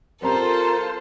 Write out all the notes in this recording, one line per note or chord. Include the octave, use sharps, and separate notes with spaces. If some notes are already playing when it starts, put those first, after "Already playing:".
G3 C4 F4 A4 A#4 C5 A#5